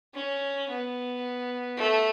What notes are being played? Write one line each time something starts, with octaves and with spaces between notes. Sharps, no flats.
C#4
B3
A3